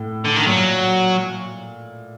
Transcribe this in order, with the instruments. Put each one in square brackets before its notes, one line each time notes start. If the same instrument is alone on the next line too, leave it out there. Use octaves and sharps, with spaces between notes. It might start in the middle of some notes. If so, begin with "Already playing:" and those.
Already playing: [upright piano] A2
[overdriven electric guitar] D3
D#3
[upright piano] A#2 [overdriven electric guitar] F#3